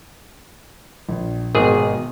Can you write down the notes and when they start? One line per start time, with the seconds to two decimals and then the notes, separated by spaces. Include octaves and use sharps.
1.09 A#1
1.55 G#1 B2 D#3 G#4